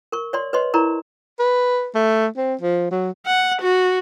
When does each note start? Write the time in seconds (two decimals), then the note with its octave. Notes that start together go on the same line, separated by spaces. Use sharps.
0.12 A#4 C#6
0.33 C#5 D5 C6
0.53 B4 C#5 D#5 C6
0.74 E4 A#4 D5 A#5 C#6
1.39 B4
1.95 A3
2.37 C4
2.61 F3
2.91 F#3
3.26 F#5
3.61 F#4